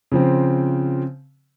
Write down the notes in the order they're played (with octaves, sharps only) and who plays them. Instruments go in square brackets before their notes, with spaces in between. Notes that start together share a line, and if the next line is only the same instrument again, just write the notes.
[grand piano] C#3 F3 C4